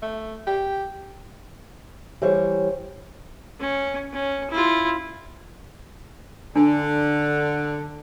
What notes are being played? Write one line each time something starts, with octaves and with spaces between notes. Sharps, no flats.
A3
G4
E3 G3 C5 C#5
C#4
C#4
E4 F4
D3 D4